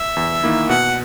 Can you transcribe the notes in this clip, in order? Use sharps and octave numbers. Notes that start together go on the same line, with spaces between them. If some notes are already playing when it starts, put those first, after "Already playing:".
Already playing: E5
E2
D#3 A#3 E4
B2 F#5